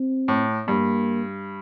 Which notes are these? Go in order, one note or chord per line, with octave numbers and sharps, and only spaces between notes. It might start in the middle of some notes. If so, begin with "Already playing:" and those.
Already playing: C4
A2
G2 A#3